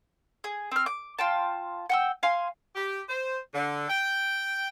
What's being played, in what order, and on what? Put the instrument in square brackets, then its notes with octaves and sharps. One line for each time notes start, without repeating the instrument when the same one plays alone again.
[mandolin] G#4
C4 F6
D6
F4 G5 A5
F#5 G5 E6
F5 G#5 C6
[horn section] G4
C5
D3
G5